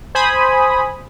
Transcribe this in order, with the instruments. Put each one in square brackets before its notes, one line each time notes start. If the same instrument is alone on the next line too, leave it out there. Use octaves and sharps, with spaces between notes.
[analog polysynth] C5 G#5 B5 D#6